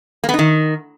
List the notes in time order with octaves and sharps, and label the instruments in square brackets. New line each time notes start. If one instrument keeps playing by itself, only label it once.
[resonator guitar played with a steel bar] A#3
B3
D#4
D#3